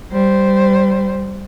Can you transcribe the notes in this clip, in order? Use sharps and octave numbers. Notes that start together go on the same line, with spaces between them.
G3 C5